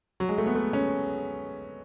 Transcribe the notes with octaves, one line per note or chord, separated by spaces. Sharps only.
F#3
G#3
A3
B3
A3
C#4